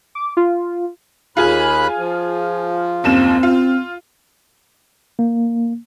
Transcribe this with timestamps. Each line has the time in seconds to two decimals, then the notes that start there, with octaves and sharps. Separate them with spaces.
0.15 D6
0.37 F4
1.37 D#2 F4 G#4 G#5 B5 F#6
1.98 F3
3.04 F#1 D#2 C4 E7
3.43 F4
5.19 A#3